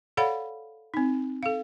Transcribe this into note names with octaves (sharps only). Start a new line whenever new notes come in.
A4 C#5 D5 F5 F#5 B5
C4 D#4
A4 F5